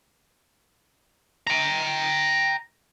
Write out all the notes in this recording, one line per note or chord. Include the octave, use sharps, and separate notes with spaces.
G5 A#5